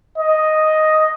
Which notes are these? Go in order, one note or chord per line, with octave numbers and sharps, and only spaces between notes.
D#5